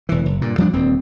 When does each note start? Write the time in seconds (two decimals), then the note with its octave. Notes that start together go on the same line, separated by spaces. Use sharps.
0.09 E1 E3
0.26 F#1
0.41 G2 A#2
0.58 F3 G3 A#3 D4
0.73 D#1 D2 C4